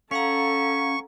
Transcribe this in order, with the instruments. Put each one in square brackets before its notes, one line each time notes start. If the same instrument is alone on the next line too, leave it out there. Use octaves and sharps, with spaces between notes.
[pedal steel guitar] C#4 [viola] A4 [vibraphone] F5 F#5 A#5 [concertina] C#6